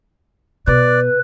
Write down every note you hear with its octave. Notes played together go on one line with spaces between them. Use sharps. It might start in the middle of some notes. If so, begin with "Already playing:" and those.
B2 B4 D5